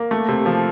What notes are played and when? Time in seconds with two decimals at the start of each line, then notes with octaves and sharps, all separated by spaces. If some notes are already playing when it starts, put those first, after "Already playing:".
Already playing: A#3
0.11 A3
0.28 C3
0.46 F3